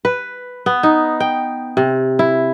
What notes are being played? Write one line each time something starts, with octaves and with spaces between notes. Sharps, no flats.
B4
B3
D#4
G5
C3
E4